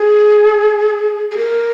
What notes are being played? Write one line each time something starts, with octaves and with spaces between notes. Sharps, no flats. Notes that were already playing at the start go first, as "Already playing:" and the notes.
Already playing: G#4
G#4
A#4